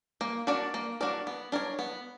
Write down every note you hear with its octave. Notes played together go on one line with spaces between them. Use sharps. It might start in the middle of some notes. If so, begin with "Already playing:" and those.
A#3
D4 F#4 A#4 D5
A#3
D4 F#4 A#4 D5
B3
D4 A#4 C#5
B3